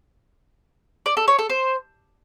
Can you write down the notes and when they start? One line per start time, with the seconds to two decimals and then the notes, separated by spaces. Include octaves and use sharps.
1.06 D5
1.17 A4
1.28 C#5
1.39 A4
1.49 C5